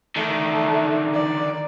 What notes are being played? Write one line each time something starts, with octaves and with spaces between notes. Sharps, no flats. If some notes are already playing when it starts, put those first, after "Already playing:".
D3 D#3 A3
D5